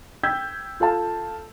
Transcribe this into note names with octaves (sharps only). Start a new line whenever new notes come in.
G5 E6 G6 G#6 B6
F4 A4 F5 A5